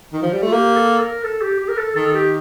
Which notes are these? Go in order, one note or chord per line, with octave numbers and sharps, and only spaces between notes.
D#3
F3
G3
A3 F4
A#3 G4
A4
A#4
A4
G4
G4
A#4
A4
D#3 A4
A4
G4